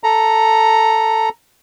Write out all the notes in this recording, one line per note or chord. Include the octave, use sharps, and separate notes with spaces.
A4 A#5